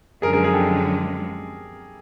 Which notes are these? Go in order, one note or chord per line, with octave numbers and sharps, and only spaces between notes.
F#2 D3 F3 G#3 G#4 A#4
G#4 A#4
G#4 A#4
G4 A4